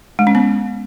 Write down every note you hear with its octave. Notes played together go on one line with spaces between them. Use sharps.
G#3
C#4
B3